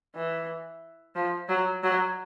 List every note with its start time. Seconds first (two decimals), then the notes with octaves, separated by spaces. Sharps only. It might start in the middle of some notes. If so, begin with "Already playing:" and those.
0.15 E3
1.15 F3
1.49 F#3
1.83 F#3